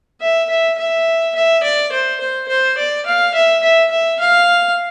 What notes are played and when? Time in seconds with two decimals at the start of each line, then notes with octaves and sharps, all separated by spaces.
0.21 E5
0.49 E5
0.78 E5
1.35 E5
1.64 D5
1.92 C5
2.20 C5
2.48 C5
2.77 D5
3.06 F5
3.34 E5
3.63 E5
3.91 E5
4.20 F5